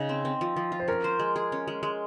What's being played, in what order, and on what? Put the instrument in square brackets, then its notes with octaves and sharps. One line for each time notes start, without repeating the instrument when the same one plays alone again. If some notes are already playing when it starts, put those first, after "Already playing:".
Already playing: [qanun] C#3 D#4 [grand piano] D#5
[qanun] C4
C4
F3
F3
F4
[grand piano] C5
[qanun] C#4 [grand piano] A#4
[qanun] C5
G#3
G#4
C#4
G#3
G#3